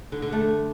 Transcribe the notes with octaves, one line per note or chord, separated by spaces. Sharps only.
D3
D3
A3